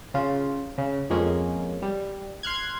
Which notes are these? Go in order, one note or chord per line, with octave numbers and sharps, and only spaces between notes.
C#3 F4
C#3
F2 G#3 A#3 C#4
G3
C6 F6 F#6 G#6